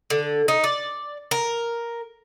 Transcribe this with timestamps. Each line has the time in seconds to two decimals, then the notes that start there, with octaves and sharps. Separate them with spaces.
0.10 D3
0.48 D#4
0.64 D5
1.31 A#4